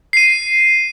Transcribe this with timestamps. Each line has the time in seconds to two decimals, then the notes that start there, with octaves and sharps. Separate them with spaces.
0.13 C7 D#7